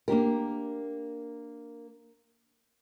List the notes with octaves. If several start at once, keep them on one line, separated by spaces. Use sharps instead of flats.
A#3 D4 G4 A#4